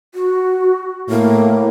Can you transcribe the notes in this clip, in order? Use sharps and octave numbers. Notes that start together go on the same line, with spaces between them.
F#4
A2 A#3